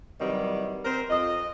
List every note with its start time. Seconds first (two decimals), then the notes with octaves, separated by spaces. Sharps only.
0.20 C3 D#3 E3 F#3 G3
0.84 C4 A#4 C5
1.10 F2 D#5